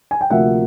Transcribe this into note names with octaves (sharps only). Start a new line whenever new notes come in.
G#5
G5
D2 C3 F3 A#3 E5 F#5